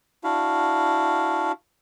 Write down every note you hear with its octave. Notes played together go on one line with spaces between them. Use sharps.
D4 E4 F#4 F5